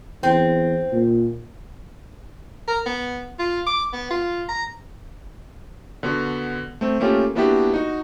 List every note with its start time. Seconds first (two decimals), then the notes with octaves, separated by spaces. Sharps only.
0.23 E2 C4
0.92 A#2
2.68 A#4
2.86 B3
3.39 F4
3.67 D6
3.93 B3
4.10 F4
4.49 A#5
6.03 D3 B3 F#4
6.81 A3 C4
7.00 A3 A#3 C#4 F4 G4 A4
7.35 A#3 B3 D4 E4 F#4 G4
7.73 D#4 F#4